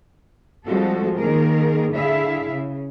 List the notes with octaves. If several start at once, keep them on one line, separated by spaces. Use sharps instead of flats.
F3 G3 G#3 C4 F#4 A4
D#3 A#3 G#4 A#4
D3 E4 G#4 E5 F5
C#3